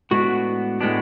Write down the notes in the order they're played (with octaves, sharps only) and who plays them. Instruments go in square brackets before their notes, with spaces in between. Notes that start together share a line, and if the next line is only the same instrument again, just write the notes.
[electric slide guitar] A2 G#3 B3 D4 F#4
A2 G#3 B3 D4